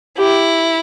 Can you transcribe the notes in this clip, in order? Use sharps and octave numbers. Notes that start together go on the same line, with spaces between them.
E4 G4